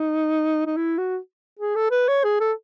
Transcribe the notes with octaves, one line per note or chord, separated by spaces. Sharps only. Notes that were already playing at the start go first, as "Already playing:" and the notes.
Already playing: D#4
D#4
E4
F#4
G#4
A4
B4
C#5
G#4
A4